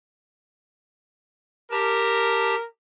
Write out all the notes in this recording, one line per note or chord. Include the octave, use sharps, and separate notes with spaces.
G4 A#4 A5